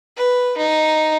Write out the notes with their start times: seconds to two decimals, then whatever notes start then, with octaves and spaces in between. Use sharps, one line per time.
0.17 B4
0.57 D#4